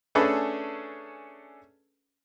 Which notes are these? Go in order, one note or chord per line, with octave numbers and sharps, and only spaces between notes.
A3 C#4 D4 G#4 A4 B4